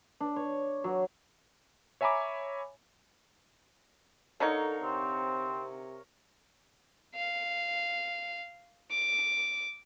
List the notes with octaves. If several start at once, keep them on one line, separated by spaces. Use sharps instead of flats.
D4
C#5
F#3
C#5 E5 G#5 A#5 B5 D6
D3 D#4 A4 A#4 C#5 F5
C3 C4
F5
D6